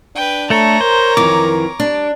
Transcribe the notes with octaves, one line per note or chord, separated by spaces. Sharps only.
D4 B4 G5
A3 A4 C#5 A#5
A#4 C5
F2 D#3 E3 D6
G3 D4